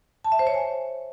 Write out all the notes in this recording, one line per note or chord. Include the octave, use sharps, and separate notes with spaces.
A5
E5
C5
C#5
G#5